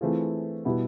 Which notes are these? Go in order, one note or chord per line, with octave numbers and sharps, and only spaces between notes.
E3 A3 C4 F4 G#4
B2 G3 B3 E4 G4